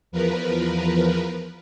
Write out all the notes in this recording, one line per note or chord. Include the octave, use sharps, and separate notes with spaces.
E2 F3 A#4 B4